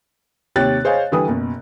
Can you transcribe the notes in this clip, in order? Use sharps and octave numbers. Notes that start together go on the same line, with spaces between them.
D#2 C3 G4 C#5 F#6 A6
G#4 C5 C#5 D#5 F5 G#5
D3 E3 G3 A4 B4 D#6
F#1 B2